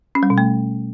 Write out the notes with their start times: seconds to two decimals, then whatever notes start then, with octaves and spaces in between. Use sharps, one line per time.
0.15 C#4
0.23 G3
0.30 B2
0.38 A3